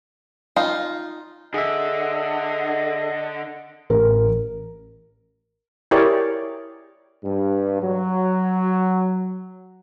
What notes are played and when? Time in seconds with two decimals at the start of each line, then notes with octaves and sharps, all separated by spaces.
0.56 D#4 F4
1.54 D3 G#4 D#5 E5
3.90 A1 A#4
5.91 E4 G4 G#4 A#4 C#5 D5
7.24 G2
7.82 F#3